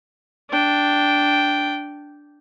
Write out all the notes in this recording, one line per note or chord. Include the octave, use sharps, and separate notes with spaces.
D4 G5